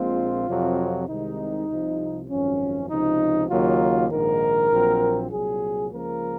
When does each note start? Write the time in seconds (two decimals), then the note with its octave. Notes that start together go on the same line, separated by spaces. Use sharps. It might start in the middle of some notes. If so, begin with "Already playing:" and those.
Already playing: A#1 A#2 G#3 C4 F4
0.47 F2 C3 F#3
1.08 C2 C3 D#3 G#3 D#4
1.68 C2 C3 F3
2.29 G#1 F#2 F3 C#4
2.89 C#2 C3 F3 D#4
3.50 D#2 C#3 F#3 A#3 F4
4.10 A#1 G#2 D#3 A#4
4.71 A#1 A#2 F#3 C4
5.31 C2 A#2 F#3 G#4
5.92 C#2 C#3 F3 A#3 A#4